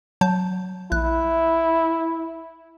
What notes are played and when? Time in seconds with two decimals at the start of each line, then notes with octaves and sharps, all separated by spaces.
0.21 F#3 A5 G6
0.92 A#1 E4 F#6